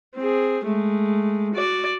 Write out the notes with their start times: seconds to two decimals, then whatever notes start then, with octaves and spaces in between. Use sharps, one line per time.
0.15 C4 G#4
0.64 G#3 A3
1.54 F#4 D5